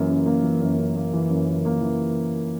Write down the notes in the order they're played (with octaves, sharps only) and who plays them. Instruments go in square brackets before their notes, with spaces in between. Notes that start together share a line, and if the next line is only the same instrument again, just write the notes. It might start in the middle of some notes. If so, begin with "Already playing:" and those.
Already playing: [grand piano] F#2 E3 A#3
C#3
A#3
E3
F#2
C#3
A#3
E3
F#2
C#3
A#3
E3